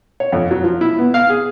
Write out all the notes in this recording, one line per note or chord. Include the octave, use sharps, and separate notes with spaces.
C#5
F2
F#3
F3
E4
B3
F5
G#4